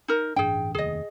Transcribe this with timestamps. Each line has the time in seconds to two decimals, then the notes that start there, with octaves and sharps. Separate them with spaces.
0.08 D#4 A#4
0.36 A1 G2 D4 G#4 G5
0.75 F1 D#2 G#4 D#5